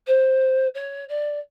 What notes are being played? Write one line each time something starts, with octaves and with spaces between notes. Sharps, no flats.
C5
C#5
D5